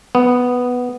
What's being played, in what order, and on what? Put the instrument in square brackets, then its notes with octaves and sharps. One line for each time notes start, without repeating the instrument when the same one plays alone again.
[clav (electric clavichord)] B3